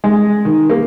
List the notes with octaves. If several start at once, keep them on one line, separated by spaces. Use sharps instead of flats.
G#3
D#3
A#3